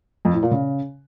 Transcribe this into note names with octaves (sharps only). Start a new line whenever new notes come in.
F2
A2
A#2
C#3